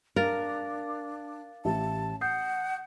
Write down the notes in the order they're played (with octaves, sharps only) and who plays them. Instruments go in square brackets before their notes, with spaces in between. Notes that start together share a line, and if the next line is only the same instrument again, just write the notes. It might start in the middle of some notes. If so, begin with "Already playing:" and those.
[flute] D4 [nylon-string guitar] A#4 [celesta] F5 A6
[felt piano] A1 G4 E5 [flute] A5
[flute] F#5 [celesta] D#6 G6 [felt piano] C7